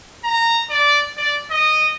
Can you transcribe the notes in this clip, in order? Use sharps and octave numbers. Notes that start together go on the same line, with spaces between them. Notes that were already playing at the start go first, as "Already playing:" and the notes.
A#5
D5
D5
D#5